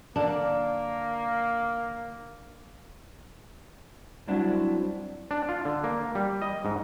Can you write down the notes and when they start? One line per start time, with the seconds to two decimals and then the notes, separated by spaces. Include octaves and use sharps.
0.16 D3 A#3 D4
4.28 F#3 G3 C4 D4 E4 F#4
5.31 D4
5.49 F4
5.65 D3
5.84 A#3
6.15 G3
6.42 D#5
6.65 G#2